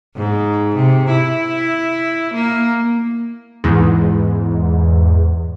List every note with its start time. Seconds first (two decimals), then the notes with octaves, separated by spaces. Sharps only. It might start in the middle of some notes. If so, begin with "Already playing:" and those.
0.17 G#2
0.76 C3
1.10 E4
2.34 A#3
3.64 E2 G#2